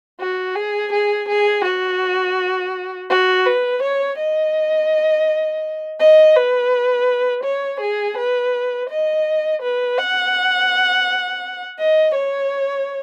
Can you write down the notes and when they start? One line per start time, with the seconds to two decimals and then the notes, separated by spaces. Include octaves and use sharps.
0.20 F#4
0.56 G#4
0.93 G#4
1.29 G#4
1.65 F#4
3.10 F#4
3.46 B4
3.83 C#5
4.18 D#5
6.00 D#5
6.36 B4
7.44 C#5
7.81 G#4
8.17 B4
8.90 D#5
9.62 B4
9.98 F#5
11.79 D#5
12.15 C#5